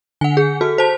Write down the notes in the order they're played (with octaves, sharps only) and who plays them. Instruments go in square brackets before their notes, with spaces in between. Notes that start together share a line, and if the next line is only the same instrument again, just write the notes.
[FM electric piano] D3 [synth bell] F#5 G#5
[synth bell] G#4
[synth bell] F#4 [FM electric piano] A4
[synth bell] C5 A5